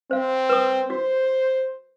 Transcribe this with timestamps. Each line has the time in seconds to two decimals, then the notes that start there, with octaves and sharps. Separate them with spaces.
0.11 C4 C5 F5
0.49 B4 D#6
0.90 F#4 C5